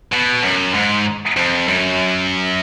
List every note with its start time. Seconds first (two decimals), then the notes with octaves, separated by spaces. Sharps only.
0.12 B2
0.43 F#2
0.74 G#2
1.37 F2
1.68 F#2